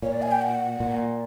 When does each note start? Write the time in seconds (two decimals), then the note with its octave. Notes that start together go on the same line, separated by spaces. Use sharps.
0.02 A#2 C#5
0.12 D5
0.22 G#5
0.31 G5
0.41 F#5
0.80 A#2